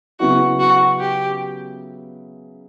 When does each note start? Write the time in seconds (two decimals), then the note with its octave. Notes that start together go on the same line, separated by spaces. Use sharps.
0.20 C#3 F#3 B3 E4 F#4
0.60 F#4
1.00 G4